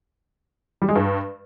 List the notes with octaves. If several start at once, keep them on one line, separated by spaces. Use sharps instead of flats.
G3
G#3
G2